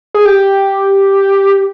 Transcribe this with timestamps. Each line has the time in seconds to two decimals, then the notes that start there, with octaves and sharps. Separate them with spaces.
0.14 G#4
0.25 G4